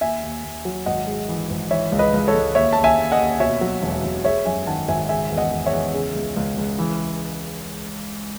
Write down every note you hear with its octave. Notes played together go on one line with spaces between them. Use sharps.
D#2 E5 G#5
D#2
D#2
F#3
G#1 D#5 F#5
G#3
E3
G#1
E3 C#5 E5
C#2
B4 D#5
C#2
A4 C#5
C#2
D#2 C#5 E5
D#2 A5
E5 G#5
D#2
D#5 F#5
D#2
B2 C#5 E5
F#3
E1
E1
G#3 C#5 E5
F#2 E5 G#5
D#3 F#5 A5
G#1 E5 G#5
C#3 E5 G#5
E2
D#5 F#5
E2
C#5 E5
E2
C#3
C#2
C#2
C#2
E3